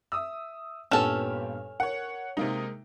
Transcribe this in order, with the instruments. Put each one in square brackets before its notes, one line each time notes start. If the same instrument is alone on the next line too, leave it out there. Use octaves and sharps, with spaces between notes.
[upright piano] E5 D#6 E6
[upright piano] G2 A#2 B3 [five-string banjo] C#4 A4 [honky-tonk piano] G4 F6 E7
[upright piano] A#4 [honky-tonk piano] C#5 F#5
[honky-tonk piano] C3 A#3 D#4 [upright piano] G#3 A#4